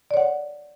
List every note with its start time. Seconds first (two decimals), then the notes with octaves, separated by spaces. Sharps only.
0.11 D5
0.14 C#5
0.17 F#5